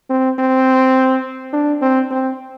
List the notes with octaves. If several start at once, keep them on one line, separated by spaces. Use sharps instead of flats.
C4
C4
D4
C4
C4